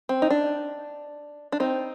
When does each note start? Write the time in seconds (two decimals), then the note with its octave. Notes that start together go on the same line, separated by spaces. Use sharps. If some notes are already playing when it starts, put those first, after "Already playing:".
0.09 C4
0.22 D#4
0.30 D4
1.52 D4
1.60 C4 D#4